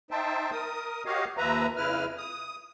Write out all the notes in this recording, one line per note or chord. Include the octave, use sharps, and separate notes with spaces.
D#4 C5 E5 G5 A5
A#4 D#6
F#4 G4 C#5 D#5 F5
D#2 F3 B4 E5 A#5
F2 C#3 E4 B4 F6
D#6